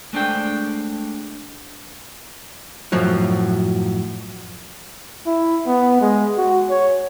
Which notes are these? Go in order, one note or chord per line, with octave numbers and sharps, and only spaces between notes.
G#3 A3 D4 C5 G5
F#2 A2 F3 F#3
E4
B3
G#3
F#4
C#5